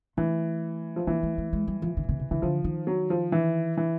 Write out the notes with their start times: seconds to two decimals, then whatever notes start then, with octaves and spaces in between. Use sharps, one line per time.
0.17 E3 A3
0.96 F3
1.07 E3 A#3
1.23 A3
1.38 A3
1.53 G#3
1.68 G3
1.82 F3
1.97 D3
2.03 C#3
2.09 C3
2.19 C3
2.31 C#3 E3
2.42 D3 F3
2.64 D#3
2.87 F#3
3.10 F3
3.32 E3
3.77 E3